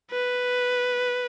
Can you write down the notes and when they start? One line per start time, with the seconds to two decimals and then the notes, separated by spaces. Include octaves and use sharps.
0.11 B4